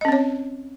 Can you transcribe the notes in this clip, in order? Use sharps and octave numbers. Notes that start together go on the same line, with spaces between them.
C4 C#4 C#5 D#5